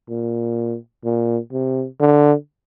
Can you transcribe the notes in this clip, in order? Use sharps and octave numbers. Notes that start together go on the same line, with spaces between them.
A#2
A#2
C3
D3